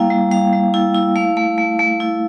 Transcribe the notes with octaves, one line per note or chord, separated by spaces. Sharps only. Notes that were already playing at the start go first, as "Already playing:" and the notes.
Already playing: G3 A#3 E4 F5 G5
G3
G3 F5
G3
E4
E4
A3 F5
A3
A3
A3
E4